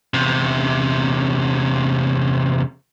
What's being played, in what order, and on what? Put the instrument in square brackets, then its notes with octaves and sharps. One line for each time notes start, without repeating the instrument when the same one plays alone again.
[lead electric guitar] E2 C3